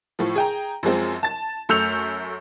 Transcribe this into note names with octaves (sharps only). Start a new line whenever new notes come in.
A2 F3
G#4 G5 A#5
F#2 F3 G#3 C4
A5 A6
F#2 A3 E6 G6 C#7 F7